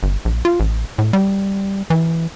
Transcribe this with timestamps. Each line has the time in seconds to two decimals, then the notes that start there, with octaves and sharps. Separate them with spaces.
0.03 G1
0.25 A#1
0.45 F4
0.60 A1
0.98 A2
1.13 G3
1.90 E3